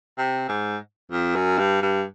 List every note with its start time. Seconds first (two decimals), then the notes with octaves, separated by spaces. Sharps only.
0.18 C3
0.49 G#2
1.12 F2
1.35 F#2
1.58 G2
1.82 G2